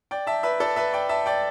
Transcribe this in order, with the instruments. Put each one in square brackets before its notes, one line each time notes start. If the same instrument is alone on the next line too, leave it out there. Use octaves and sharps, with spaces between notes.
[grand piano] D5 G5
E5 A5
B4 E5
A4 D5
B4 E5
D5 G5
E5 A5
D5 G5